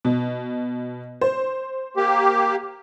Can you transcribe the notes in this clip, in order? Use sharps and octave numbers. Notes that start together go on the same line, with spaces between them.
B2
C5
A#3 G4